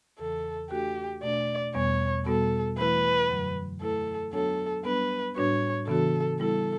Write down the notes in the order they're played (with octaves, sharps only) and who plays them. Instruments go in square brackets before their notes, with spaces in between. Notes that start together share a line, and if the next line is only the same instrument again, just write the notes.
[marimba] E2 C#3 E3 [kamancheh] A4
[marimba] A3 D4 F#4 A4 [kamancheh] G4
[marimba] B2 A3 D4 [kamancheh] D5
[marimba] E2 B2 G3 B3 [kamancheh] C#5
[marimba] B2 G3 B3 F#4 [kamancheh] A4
[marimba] E3 A3 E4 [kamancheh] B4
[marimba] F#2 D3 F#3
[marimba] A3 E4 B4 [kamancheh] A4
[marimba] F#3 B3 D4 F#4 C#5 [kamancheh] A4
[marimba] G3 B3 D4 [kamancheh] B4
[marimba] A2 G3 D4 F#4 B4 [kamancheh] C#5
[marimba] C#3 E3 B3 D4 F#4 [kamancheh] A4
[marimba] G3 B3 E4 [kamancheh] A4